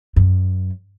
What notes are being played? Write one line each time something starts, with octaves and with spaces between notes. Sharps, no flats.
F#2